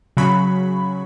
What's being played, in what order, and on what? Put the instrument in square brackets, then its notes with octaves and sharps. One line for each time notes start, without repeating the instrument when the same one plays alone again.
[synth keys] C#3 F#3 B5 C#6